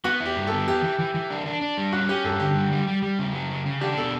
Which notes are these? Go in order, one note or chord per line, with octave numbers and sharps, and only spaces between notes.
B3 F#4
E4
G4
G2
A4
B3
E3 G4
E3
E3
E3
D4
D4
D4
G3
C#4 F#4
C#4 G4
G2 A4
D3 G4
G3
G3
G3
G3
C#3
F#3
C#3
C#3
D4 G4
B2 A4